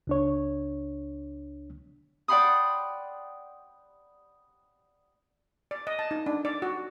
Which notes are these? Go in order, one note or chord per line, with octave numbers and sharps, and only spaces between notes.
C#2 D4 C#5
D5 F#5 G5 B5 C6 D#6
D5
D#5
A5
D#4
D4
D5
F#4